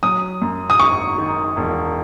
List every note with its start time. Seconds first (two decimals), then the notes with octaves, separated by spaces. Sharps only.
0.03 F#3 D#6
0.42 F#2
0.70 D#6
0.80 G#1 C#6
1.18 D#3
1.57 E1